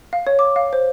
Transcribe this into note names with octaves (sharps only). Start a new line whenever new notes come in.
F5
C#5
D6
F5
C5